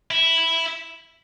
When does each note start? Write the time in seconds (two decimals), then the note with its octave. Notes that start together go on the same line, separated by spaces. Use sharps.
0.11 E4